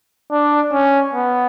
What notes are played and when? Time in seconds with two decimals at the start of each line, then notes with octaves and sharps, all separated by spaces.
0.32 D4
0.73 C#4
1.14 B3